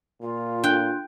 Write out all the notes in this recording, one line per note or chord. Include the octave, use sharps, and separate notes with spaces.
A#2 F4
D4 G5 F#6